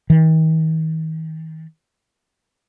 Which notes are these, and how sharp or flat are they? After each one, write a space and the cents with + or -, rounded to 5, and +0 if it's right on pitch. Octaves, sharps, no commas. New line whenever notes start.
D#3 +40